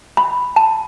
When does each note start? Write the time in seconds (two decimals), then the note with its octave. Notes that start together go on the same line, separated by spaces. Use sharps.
0.17 B5
0.56 A5